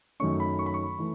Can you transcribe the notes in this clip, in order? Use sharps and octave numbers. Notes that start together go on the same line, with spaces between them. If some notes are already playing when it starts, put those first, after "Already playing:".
F#2 D#3 A3 C#4 C#6
B5
C#6
B5
C#6
E3 A3